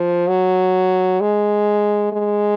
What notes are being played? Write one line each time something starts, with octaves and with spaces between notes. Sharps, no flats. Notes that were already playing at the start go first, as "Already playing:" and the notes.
Already playing: F3
F#3
G#3
G#3